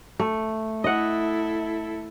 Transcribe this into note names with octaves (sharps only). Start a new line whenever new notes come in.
A3
E4 A4 D#5 F#5